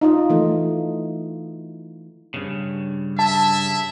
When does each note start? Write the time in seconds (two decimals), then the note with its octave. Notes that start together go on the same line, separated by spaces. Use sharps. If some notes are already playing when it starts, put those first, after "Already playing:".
0.01 D#4 F4 D#5
0.30 E3 A3
2.34 G2 C#3
3.19 G#4 E5 A5